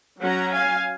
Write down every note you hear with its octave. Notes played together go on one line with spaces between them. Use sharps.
F#3 C#4 F#5 A#5
F5 G#5